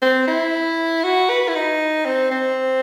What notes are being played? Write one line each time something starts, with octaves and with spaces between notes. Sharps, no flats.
C4
E4
F#4
B4
E4
D#4
C4
C4